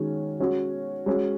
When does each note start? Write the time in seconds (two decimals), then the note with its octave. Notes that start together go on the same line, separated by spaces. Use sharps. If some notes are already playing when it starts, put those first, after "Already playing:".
Already playing: D#3 G#3 C#4 F#4
0.40 G#3 C#4 F#4
1.06 G#3 C#4 F#4